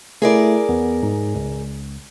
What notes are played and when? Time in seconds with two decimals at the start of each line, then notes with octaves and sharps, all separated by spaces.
0.22 A3 E4 G#4 A#4 D5
0.69 E2 B3
1.03 G#2
1.35 C#2